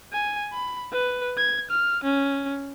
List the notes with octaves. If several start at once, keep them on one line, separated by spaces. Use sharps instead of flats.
G#5
B5
B4
G#6
F6
C#4